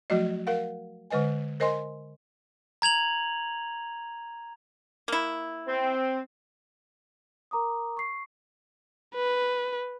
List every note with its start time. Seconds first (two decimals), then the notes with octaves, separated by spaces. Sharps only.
0.10 F3 F#3 A3 F#4 D5 D#5
0.47 A#4 F5 F#5
1.10 D3 G#3 B4 D#5 G#5
1.60 A#4 C5 D#5 G#5 C6
2.82 A#5 G#6 F7 F#7
5.08 A#3 E4
5.68 C4
7.51 A#4 A#5 D6 D#6
7.97 C#6 C7
9.15 B4